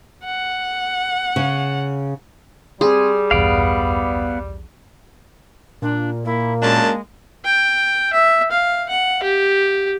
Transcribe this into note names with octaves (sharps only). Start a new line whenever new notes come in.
F#5
C#3
G3 C4 G#4 C6
B1 E2 G2 B3 D5 F5
A#2 D4
A#3 E4
F#2 G#3 D4 A5
G5
E5
F5
F#5
G4